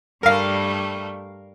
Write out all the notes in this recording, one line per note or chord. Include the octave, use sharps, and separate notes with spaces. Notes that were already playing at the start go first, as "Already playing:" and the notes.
G2 G3 A3 A#4 F5